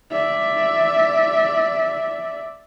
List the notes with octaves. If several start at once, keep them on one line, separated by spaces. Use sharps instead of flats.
D5 E5